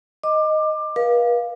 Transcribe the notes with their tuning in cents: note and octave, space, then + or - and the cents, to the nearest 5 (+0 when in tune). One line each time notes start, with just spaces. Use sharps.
D#5 +0 D6 +20
B4 -45 F5 +0